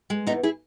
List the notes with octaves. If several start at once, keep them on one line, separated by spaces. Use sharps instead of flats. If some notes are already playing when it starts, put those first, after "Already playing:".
G#3
E2 B3 D#4
E4 G#4